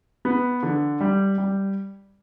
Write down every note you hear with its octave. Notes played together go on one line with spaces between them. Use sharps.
B3
D3
G3
G3